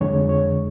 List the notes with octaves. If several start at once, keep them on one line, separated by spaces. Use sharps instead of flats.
F2 D3 G#3 C#5
C#5